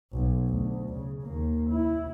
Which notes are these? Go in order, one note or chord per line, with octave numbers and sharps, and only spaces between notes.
B1
D2
C#3
D#2 A#3
E4